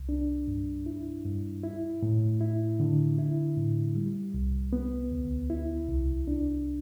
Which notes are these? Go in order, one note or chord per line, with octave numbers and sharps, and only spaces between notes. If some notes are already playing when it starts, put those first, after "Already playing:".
Already playing: C2
D4
G2
E4
G2
E4
A2
E4
D3
E4
A2
G3
C2
B3
D2
E4
C2
D4